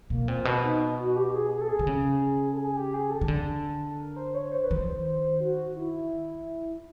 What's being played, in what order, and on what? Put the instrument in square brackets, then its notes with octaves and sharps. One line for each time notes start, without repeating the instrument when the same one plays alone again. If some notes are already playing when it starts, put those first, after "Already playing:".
[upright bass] B2 [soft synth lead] A#3
[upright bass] A#2 [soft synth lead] C4
[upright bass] B2
[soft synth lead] D#4
F#4
G4
G4
G#4
G#4
A4
G#4
[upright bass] D3
C#3
[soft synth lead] A4
G#4
G4
G#4
A4
[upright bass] D#3
D3
[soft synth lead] A#4
C5
C#5
C5
B4
[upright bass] D#3 [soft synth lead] C5
[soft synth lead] F#4
E4